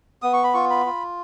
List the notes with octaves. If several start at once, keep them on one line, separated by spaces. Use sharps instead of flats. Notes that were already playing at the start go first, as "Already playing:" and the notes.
B3 D#6
C#6
B5
F4 C#6
B5
F4